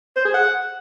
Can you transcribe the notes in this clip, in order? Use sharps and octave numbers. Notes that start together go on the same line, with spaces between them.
C5
G#4
F#5